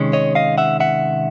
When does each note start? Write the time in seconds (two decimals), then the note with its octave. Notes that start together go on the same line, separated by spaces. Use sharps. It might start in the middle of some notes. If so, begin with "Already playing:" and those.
Already playing: C3 D#3 G#3 C#4
0.13 C#5 D#5
0.35 D#5 F5
0.58 E5 F#5
0.80 E5 F#5